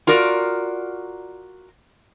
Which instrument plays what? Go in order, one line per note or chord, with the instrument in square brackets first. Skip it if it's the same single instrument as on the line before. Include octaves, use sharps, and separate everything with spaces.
[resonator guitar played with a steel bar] F4 F#4 A#4 D5